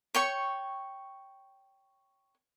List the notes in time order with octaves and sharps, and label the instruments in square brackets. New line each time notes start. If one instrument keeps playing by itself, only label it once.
[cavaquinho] C#5 G5 C#6